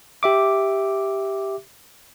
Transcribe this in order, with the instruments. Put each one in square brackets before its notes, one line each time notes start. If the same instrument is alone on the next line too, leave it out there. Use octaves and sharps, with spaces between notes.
[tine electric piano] G4 E5 D6